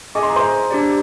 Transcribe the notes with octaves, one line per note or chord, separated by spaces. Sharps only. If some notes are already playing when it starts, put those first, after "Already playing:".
G#4 D#5 G#5 D6
C6
A#5
C5 C6
D4 G4 D5